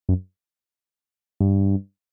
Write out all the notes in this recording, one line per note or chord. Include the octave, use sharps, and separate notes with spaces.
F#2
G2